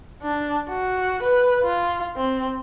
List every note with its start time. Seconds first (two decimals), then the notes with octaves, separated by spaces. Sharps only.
0.23 D4
0.69 F#4
1.23 B4
1.63 F4
2.17 C4